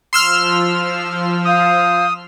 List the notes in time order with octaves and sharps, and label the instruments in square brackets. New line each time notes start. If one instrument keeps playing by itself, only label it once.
[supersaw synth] F3 [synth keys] C6 E6 F6
[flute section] F5 G6 [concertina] D#6